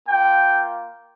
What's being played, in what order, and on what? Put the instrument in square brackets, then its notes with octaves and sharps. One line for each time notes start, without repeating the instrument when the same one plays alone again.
[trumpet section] A#3 F4 G5